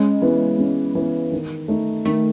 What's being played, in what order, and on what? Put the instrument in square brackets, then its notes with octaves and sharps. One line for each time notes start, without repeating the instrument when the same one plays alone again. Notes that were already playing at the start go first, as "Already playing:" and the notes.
Already playing: [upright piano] C#3 [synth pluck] G#3
[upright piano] E3 B3
C#3
E3 B3
D#3
A3 D#4
[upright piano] D#3 [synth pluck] A3